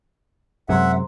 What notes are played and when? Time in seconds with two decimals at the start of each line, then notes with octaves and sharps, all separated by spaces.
0.69 F#2 C3 G#3 C5 E5 F#5 A#5 C6